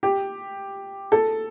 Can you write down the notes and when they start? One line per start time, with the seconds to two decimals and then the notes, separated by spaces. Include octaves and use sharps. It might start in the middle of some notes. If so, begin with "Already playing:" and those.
0.03 G4
1.12 A4